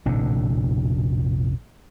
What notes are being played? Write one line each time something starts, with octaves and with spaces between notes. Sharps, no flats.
F1 A#1 A2 D3